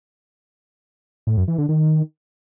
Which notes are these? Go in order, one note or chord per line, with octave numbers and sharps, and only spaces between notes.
A2
F#2
E3
D3
D#3